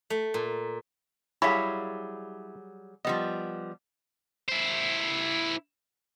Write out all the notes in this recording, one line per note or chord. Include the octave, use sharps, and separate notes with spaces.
A3
A#2
F#3 G3 E4 G#4 C#5 F5 B5
F3 G3 B3 D#5
E4 C5